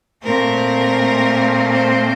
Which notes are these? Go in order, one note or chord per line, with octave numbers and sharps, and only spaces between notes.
A#2 A3 C4 A#4
C5